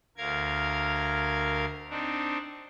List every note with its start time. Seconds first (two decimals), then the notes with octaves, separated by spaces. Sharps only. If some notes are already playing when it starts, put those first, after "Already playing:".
0.17 D2 A#4 F5 G#6
1.90 C4 D4 D#4